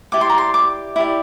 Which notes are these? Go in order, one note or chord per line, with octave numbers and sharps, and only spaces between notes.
E4 G4 D5 D6
C6
A#5
C6
D6
E4 G4 D5